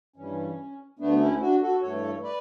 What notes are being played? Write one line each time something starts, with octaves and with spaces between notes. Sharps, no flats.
G2 E3 G3 C#4
D2 D3 A3 B3 D4
C#4 E4
D4 F#4
F#4 A4
G2 E3 A3 A4 C#5
B4 D5